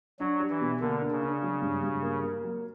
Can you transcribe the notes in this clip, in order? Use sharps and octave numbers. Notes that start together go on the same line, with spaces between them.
F#3 D4
G4
E3
B2
D3 A#3
D4
C#3
D4
F#3
G2
G2
A#3
A#3
F#3